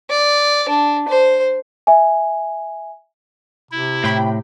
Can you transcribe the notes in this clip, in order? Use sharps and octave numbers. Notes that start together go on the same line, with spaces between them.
D5
D4
C5
E5 G#5
C3 E4
A2 G5 B5